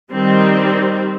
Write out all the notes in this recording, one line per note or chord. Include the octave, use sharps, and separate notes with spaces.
D#3 G3 C4